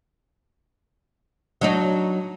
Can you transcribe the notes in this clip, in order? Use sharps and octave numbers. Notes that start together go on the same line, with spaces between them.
F#3 D4 D#4